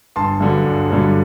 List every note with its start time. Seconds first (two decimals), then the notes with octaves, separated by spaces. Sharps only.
0.16 G1 A5 C6
0.40 G2 D3 F#3
0.66 G1
0.90 G2 D3 F#3